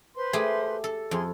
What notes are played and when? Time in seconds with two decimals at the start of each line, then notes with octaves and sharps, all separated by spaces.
0.16 B4 C5 C6
0.33 A3 G4 G#4
0.84 A4
1.11 F2 G#4 C6